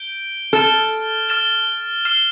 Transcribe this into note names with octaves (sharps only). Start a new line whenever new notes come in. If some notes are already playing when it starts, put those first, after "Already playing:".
Already playing: G6 D7 G7
A4 F6 A6 E7 G7
F6 A6 E7 G7
F6 C7 E7 G7